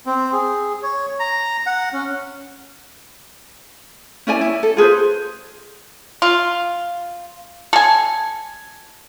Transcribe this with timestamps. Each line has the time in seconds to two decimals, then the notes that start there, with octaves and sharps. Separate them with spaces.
0.06 C4
0.33 G#4
0.83 C#5
1.20 A#5
1.67 F#5
1.93 C#4
4.27 C#4 E4 D5 G#5
4.41 E4
4.63 A4
4.77 F4 G#4 B4 C5
6.22 F4
7.73 A4 G#5